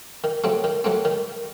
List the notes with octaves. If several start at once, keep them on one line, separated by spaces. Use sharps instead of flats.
D#3
F#3 A3 C4
D#3
F#3 A3 C4
D#3